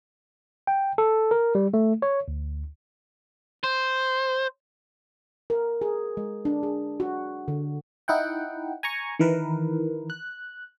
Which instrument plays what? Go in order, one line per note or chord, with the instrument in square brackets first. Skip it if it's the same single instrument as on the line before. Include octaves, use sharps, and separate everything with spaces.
[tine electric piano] G5
A4
A#4
G3
A3
C#5
D2
[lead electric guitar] C5
[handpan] A#4
G#4
G#3
D4
G#4
F#4
D3
[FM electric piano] D#4 E4 F#5 G5
G#5 A#5 C#6
D#3 E3 A#4 B4
F#6